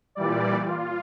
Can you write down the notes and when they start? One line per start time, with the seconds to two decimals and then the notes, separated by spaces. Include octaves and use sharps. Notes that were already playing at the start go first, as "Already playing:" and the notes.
0.15 A#2 E3 G3 D5
0.65 F4